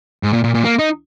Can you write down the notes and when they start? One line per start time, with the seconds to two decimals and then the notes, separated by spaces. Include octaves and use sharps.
0.23 G#2
0.33 A#2
0.44 A#2
0.55 A#2
0.65 A#3
0.79 D#4